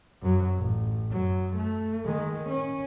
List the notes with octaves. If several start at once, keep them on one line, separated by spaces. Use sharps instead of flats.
F#2 F#3
A1
F#2 F#3
A3
D#3 G#3
C#4